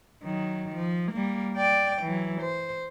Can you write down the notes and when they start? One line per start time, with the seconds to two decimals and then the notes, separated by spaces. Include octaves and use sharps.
0.23 D#3 F#3
0.76 F3
1.12 G3 A#3
1.56 D5 G5
2.02 E3 F#3
2.41 C5